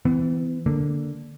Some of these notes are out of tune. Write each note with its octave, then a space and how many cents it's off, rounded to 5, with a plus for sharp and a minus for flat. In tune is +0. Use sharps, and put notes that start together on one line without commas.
E3 +0 B3 +45
D3 +0 A#3 +0